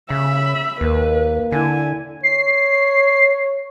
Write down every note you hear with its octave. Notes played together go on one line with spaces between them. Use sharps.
C#3 E5 B5
D#2 A#3 B4
D3 E4 G#5
C#5 C7